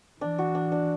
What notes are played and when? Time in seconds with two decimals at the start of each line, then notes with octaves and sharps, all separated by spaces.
0.21 E3 D4
0.39 F#4
0.55 D4
0.72 D4